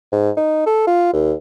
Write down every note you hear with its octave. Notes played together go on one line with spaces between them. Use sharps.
G#2
D#4
A4
F4
D#2